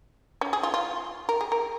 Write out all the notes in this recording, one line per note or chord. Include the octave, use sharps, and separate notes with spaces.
C#4
G#4
F4
F4
A#4
G#4
A#4